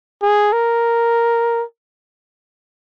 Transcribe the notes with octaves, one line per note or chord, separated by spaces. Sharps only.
G#4
A#4